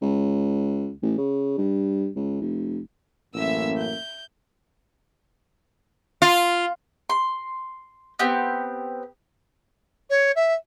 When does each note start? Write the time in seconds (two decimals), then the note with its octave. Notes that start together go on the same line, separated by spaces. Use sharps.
0.01 C#2
1.02 A1
1.18 C#3
1.58 G2
2.16 C#2
2.41 F1
3.34 A1 F#2 A#3 E5 E6
3.79 G6
6.22 F4
7.10 C6
8.19 B3 C4 G4
10.10 C#5
10.36 E5